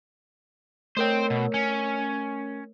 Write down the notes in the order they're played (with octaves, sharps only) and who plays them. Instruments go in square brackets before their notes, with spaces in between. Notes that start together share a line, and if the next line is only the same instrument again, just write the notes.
[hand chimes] A3 A#4 C#5 [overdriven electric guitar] C5 G5
[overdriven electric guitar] B2
C#4